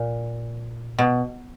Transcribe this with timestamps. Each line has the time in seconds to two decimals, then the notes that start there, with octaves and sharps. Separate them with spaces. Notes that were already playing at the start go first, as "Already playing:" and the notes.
Already playing: A#2
0.98 B2